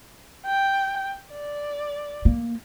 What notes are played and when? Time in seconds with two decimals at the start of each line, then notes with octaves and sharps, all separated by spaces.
0.45 G5
1.31 D5
2.25 A#3